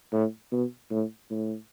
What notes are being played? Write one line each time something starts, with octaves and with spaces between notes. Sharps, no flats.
A2
B2
A2
A2